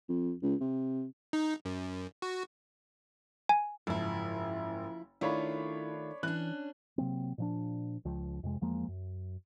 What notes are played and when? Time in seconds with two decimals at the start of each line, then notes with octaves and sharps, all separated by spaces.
0.09 F2
0.43 C#2
0.61 C3
1.33 D#4
1.65 F#2
2.22 F#4
3.49 G#5
3.87 F#1 G#2 F3 E4
5.21 D#3 A3 D4 E4 F4 C#5 B5
6.23 E3 C#4 D4 F#6
6.98 C3 F#3 A#3 C4
7.38 A#2 F3 D4
8.05 C#2 F3
8.43 F2 C3 G#3
8.61 E2 F3 G#3 A#3
8.88 F#2